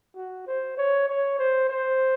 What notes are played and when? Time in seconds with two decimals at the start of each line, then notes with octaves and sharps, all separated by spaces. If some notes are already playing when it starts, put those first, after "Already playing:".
0.15 F#4
0.47 C5
0.77 C#5
1.08 C#5
1.39 C5
1.70 C5